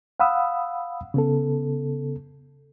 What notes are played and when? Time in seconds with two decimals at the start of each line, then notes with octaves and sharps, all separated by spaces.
0.20 F5 F#5 B5 D#6 E6
1.14 C#3 B3 A4